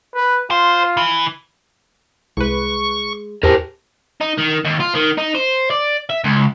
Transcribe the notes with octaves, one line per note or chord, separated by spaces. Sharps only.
B4
F4 C5
E3
C2 G#3 B4 C#6
E2 E3 G4 A#4 C5 D5 A5
D#4
D#3
D#2
F4
D#3
D#4
C5
D5
E5
C#2